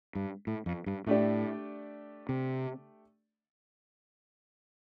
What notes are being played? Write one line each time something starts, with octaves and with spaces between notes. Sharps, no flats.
G2
A2
F2
G2
A2 A3 D4 G4 D5
C3